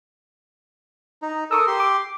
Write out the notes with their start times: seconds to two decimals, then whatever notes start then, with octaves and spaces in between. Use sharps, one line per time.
1.22 D#4
1.51 A4 A#4 C#6 D#6 E6
1.67 G4 C6
1.80 D6